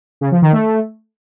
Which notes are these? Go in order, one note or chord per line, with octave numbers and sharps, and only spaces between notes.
C#3
F3
D#3
A3